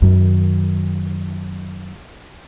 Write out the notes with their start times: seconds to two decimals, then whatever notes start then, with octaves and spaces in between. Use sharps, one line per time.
0.02 F#2 D#3